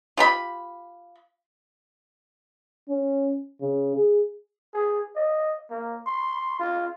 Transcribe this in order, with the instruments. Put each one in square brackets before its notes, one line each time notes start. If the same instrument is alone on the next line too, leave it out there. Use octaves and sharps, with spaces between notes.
[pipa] F4 G4 B5
[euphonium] C#4
C#3
G#4
[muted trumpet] G#4
D#5
A#3
C6
F4